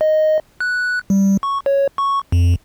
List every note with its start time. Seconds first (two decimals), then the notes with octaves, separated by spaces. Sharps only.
0.01 D#5
0.60 F#6
1.10 G3
1.43 C#6
1.66 C#5
1.98 C#6
2.32 F2